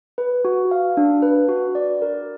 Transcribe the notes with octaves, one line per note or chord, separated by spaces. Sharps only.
B4
F#4
F5
D4
B4
F#4
D5
A#4